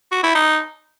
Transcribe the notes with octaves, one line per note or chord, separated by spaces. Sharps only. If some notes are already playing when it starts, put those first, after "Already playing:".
F#4
E4
D#4